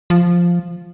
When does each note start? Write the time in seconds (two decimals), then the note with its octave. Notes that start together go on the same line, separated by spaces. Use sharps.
0.10 F3